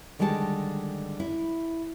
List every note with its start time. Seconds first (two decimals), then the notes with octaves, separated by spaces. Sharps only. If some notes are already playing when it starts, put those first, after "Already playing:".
0.19 D3 D#3 G3 G#3 F#5 A5
1.20 E4